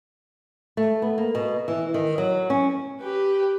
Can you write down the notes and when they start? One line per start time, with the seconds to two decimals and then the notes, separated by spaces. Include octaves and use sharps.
0.77 A3
1.02 B3
1.18 A#3
1.35 B2
1.68 E3
1.94 D#3
2.18 F#3
2.50 C#4
3.01 G4 B4